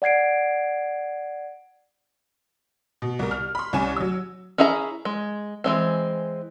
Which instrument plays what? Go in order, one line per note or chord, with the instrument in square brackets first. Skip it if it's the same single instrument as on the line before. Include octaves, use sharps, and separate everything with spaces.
[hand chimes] D5 F#5 G#6 C7 D7
[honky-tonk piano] B2
C2 A#4
F6
B5 C6
C2 C#4 C#5 G#5 E7
F#3 E6
[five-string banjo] C#4 E4 G#4 E5 A#5
G#3
E3 G#3 C4